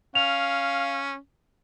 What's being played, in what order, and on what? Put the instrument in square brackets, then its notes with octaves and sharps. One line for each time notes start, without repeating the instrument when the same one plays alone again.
[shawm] C#4 [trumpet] F5 [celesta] F7